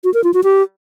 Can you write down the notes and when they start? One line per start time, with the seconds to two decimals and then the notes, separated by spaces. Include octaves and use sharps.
0.04 F#4
0.14 A#4
0.24 F4
0.34 F#4
0.44 G4